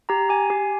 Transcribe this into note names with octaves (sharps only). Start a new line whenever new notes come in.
G4 A#5
G4 G#5
G4